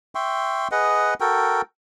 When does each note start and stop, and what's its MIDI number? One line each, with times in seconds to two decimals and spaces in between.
0.15 0.68 76
0.15 0.68 79
0.15 0.68 84
0.15 0.68 85
0.71 1.14 68
0.71 1.14 71
0.71 1.14 75
0.71 1.14 78
1.20 1.62 66
1.20 1.62 69
1.20 1.62 70
1.20 1.62 79